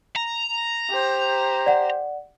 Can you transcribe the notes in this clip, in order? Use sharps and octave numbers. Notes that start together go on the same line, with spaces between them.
A#5
G4 C5
D5 F#5